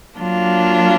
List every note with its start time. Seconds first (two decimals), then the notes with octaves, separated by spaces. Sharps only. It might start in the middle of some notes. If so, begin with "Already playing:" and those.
0.18 F#3 A#3 D4 F4